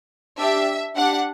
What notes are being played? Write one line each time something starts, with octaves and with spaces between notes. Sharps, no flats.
D4 G4 E5
D4 G4 F#5